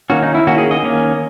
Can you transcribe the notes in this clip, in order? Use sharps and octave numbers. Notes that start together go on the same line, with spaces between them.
D#3 A#3 C#4 F#4
D#4
E4
D#3 A#3 C#4 F#4
G#4
D#5
D#3 A#3 C#4